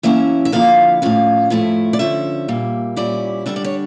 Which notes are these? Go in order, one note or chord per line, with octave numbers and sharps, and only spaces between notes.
E3 A#3 C#4 E4 E5
E5
D3 F3 A#3 E4 F5
A2 F3 C#4 F5
A2 F3 A3 E4
D5
D3 F3 C#4 E5
A#2 G3 A#3
A#2 G3 C#4 E4 D5
D3 G3 D4 E5
D5
C#5